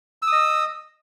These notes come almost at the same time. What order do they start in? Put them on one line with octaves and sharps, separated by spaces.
E6 D#6 D#5